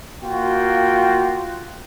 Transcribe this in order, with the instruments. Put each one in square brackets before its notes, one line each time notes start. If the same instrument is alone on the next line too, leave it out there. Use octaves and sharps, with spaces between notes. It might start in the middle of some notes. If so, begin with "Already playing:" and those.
[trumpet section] A#3 F4 F#4 G5